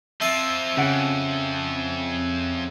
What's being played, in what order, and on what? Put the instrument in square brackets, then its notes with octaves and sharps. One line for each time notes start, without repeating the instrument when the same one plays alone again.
[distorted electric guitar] F3 C4 [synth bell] E5 E6 D#7
[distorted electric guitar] F2 [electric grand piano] C#3 F#5 D7